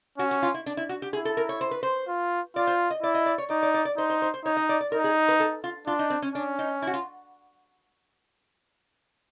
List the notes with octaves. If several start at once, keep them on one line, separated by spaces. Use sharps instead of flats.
C#4 F#4
F#4
F4
E4
D4
E4
F#4
G4
E4 G#4
A4
A#4
C#5
C5
B4
C5
F4
F4 D5
C5
D#5
E4 D5
D#5
D5
C#5
D#4 D5
D5
D5
D5
D#4 C5
C5
C5
C5
D#4 C#5
D#5
D5
D5
D#4 A#4
G#4
B4
A4
F4
D4 F4
D#4
C4
C#4
C#4 D4
D#4
E4
F#4
F4